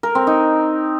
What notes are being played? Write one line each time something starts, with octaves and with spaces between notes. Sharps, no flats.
A#4
C4
D#4